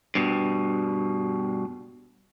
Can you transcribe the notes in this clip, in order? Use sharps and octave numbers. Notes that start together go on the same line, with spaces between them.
G2 B2